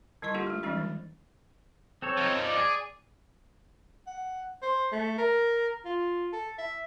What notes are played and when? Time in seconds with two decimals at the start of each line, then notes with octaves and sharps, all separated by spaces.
0.22 D3 G3 E4 D#5 C#6
0.34 A#3 D4 E4 F4 G4 A4
0.47 G#3 A3
0.63 E3 F3 G3 G#3 C#4 D#4
0.76 D#3 E3
2.02 C4 A4 C#5
2.17 F3 D#4
2.43 D5
2.57 G#4
4.07 F#5
4.62 C5
4.92 A3
5.18 A#4
5.85 F4
6.32 A4
6.58 E5